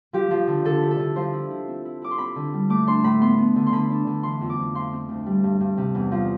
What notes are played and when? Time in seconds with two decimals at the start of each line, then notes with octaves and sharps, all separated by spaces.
0.13 F3 G4
0.31 F3
0.47 D3
0.65 D3 A4
0.82 E4
0.91 A4
0.99 D3
1.16 F3 C5
1.33 E4
1.50 E4
1.68 C4
1.85 E4
2.02 E4 D6
2.11 C6
2.18 C4 B5
2.36 D3
2.54 G3
2.70 A3 D6
2.87 D4 C6
3.04 A2 B5
3.21 B3 C6
3.38 B3
3.56 D3
3.67 C6
3.72 D3 B5
3.90 D4
4.07 D3
4.23 E3 C6
4.41 F2
4.50 D6
4.58 F2
4.74 F3 C6
4.93 C4
5.09 D2
5.26 G3
5.44 G2
5.60 G2
5.77 C3
5.95 E2
6.12 F3